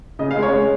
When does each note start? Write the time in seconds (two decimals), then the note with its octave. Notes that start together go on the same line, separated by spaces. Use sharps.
0.19 C#3 D#5
0.31 F5
0.37 G#3
0.43 C#5
0.53 G#3